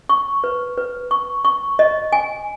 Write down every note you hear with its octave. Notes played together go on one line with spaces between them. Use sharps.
C#6
B4
B4
C#6
C#6
D#5
G#5